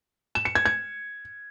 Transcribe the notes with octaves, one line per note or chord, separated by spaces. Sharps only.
E7
C#7
G#6
G#6